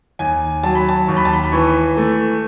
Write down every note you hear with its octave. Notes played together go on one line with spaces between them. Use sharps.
D#2 G#5
F#3 A5
B5
A5
D#2 C#6
B5
A5
B5
B5
E3 C#6
A3